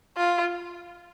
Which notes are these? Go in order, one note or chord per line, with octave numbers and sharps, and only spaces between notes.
F4